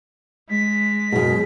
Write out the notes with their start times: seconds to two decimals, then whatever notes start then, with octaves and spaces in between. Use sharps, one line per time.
0.49 G#3 B6
1.12 F#2 B2 G#4